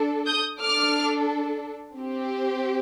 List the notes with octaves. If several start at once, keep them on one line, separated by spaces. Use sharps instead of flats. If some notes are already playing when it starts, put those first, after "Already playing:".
Already playing: D4 A4
D#6 G6
D4 A4 D6 F6
C4 G4